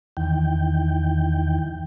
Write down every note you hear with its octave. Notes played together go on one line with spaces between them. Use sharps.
E2 D#3 E3 G5